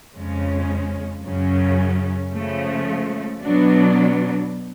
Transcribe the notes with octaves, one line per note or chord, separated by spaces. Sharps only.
F2 C#3 G#3 C#4
F#2 C#3 F#3 C#4
C#3 F3 A3
B2 F#3 B3 D4